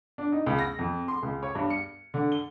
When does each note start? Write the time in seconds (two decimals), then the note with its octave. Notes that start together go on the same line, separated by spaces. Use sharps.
0.18 D4
0.32 D#4
0.46 C#2
0.59 A#6
0.79 F2
1.08 C6
1.23 C#2
1.43 C#5
1.55 G2
1.70 C#7
2.14 D3
2.32 G7